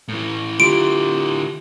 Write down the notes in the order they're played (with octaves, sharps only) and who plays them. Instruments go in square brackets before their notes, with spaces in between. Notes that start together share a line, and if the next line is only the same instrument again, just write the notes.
[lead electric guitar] A2 E3
[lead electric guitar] D3 E4 [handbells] F4 G4 [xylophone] D7